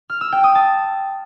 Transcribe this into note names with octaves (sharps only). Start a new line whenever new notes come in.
F6
E6
G5
D#6
A5